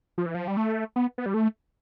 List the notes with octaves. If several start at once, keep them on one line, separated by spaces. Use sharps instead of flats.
F3
E3
F3
G3
A3
B3
B3
G3
A3